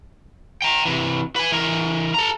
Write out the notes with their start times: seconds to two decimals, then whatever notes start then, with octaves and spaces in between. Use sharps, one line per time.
0.62 G5 A#5
0.85 C3 E3
1.36 B4 G#5
1.52 E3 A#4
2.14 A4 A#5